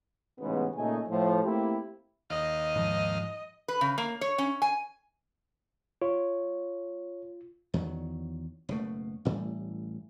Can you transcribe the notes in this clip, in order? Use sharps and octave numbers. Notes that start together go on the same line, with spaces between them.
A1 G#2 C#3 B3
A#2 C#3 A3 D#4 D#5 G#5
A2 F3
A3 A#3 C4 E4 G4
D#2 D#5 F5
G#2 F3
B4
C#3
A#3
C#5
C#4
G#5
F4 C#5
E2 D#3 F#3
F#1 B2 A3
A1 A2 G3